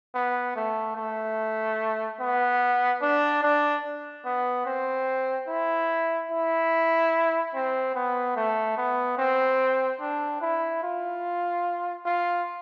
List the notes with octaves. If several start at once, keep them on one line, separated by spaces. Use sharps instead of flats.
B3
A3
A3
B3
D4
D4
B3
C4
E4
E4
C4
B3
A3
B3
C4
D4
E4
F4
F4